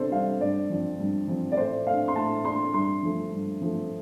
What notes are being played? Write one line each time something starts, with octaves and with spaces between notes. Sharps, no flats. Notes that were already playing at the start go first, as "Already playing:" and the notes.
Already playing: C3 D4 A4 C5
G3 D4 F5
G2 D5
F3 C4
G2
F3 C4
D5
A2 C5
A3 D4 F5
C6
A2 A5
A3 D4 C6
G2 C6
F3 A3
G2
F3 A3